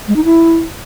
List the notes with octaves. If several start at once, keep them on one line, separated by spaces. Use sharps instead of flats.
G#3
D#4
E4